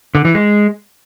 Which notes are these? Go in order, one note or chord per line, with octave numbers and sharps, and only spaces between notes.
D3
E3
G#3